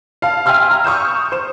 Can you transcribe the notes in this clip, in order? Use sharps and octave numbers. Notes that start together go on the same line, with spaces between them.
F5 A5
E5 G5 G#5 C6 E6 F6
A#5
C#6 D#6 G6 E7
C5 E7